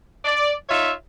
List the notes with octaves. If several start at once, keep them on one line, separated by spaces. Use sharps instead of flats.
D5
D#4 F4 C#5 E5